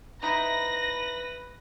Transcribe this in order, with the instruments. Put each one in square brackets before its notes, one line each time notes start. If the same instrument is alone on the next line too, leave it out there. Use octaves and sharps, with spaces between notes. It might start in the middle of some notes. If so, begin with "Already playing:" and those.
[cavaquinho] D#4 E4 C5 [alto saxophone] B4 [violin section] A#6